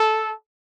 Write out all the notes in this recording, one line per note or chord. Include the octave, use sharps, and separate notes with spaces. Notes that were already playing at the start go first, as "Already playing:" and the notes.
Already playing: A4